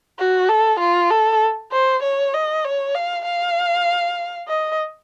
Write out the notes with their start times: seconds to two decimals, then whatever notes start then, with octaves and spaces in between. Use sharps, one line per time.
0.19 F#4
0.49 A4
0.80 F4
1.10 A4
1.72 C5
2.03 C#5
2.34 D#5
2.65 C#5
2.95 F5
3.25 F5
4.48 D#5